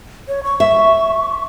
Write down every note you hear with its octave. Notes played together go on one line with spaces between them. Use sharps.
C#5
C#6
E5